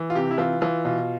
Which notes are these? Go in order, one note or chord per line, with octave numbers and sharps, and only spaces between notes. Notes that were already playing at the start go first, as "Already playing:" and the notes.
Already playing: E3
F4
C3 G4
E4
E3 F4
E3 F4
B2 F4